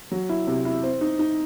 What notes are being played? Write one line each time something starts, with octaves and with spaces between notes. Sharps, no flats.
F#3
E4
C3
E4
C4
D#4
D#4